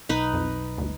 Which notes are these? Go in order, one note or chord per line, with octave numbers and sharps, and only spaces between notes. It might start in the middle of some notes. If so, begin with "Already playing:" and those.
B1 D#4 B4
F2
G1 D2